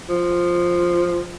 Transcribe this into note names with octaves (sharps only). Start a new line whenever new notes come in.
F3